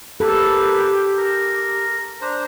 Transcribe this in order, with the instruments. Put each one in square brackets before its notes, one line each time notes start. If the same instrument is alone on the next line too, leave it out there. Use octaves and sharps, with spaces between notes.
[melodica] A#3 B4 [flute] G4 [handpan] A4
[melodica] A#4
D4 C5 A#5